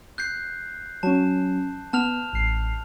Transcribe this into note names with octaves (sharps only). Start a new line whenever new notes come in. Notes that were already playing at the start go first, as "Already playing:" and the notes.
F#6 G6 C7
F#3 C#4 A5
B3 A5 F6 F7
A1 C7